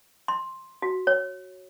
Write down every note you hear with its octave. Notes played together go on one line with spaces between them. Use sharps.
C6
F#4
C#5